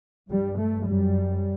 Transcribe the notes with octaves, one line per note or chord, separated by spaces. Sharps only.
G2 G3
A3
F#2 G3